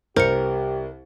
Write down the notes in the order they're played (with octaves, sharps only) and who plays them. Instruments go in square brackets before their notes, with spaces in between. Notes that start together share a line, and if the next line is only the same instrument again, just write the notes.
[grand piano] C2 [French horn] G4 [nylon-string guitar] A#4 [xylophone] C5 C#7